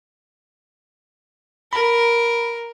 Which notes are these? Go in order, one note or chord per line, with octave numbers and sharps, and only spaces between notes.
A#4 B5